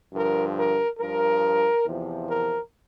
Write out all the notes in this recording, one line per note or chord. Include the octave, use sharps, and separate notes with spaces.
G2 D3 F3 A#4
A#4
G2 F3 A#4
E2 C3 F3
A#4